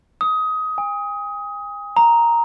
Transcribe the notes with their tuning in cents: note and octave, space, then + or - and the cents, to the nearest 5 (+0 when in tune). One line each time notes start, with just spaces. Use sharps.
D#6 +20
G#5 -40
A#5 +0